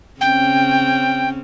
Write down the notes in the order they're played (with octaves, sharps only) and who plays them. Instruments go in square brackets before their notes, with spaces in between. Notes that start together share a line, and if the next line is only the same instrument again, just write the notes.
[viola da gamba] C#3 C4 C#4 [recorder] G5